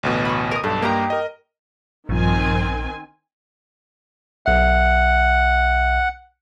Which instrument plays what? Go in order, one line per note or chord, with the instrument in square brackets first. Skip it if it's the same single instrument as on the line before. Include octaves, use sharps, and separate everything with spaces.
[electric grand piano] A1 D2 B2
[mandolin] B5 C#6
A#4 D#6
[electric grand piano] B1 G2 [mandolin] A4
[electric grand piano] G2 A#3 [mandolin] D#4 G4 A#5
[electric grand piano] A#4 D#5
[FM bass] A#1 [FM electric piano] G2 F3 [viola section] D#3 C4 G#5
[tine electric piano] B1 E5 [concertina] F#5